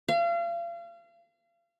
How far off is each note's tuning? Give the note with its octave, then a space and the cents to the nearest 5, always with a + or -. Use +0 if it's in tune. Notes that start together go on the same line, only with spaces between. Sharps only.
F5 -35